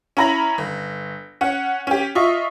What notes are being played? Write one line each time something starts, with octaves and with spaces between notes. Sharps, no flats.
C#4 E4 A#5 B5 A#6 F#7
G1
C#4 F#5
C#4 G4
F4 D#5 E5 C#6